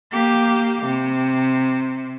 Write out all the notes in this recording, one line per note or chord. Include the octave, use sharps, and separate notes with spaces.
A#3 G4
C3